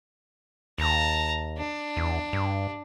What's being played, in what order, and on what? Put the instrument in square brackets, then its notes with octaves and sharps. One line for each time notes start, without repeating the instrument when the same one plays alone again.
[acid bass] D#2 [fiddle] A5 A#5
[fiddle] D4
[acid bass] E2
G2